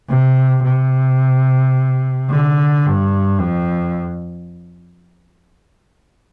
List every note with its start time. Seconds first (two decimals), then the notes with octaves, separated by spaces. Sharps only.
0.09 C3
0.64 C3
2.29 D3
2.86 G2
3.40 F2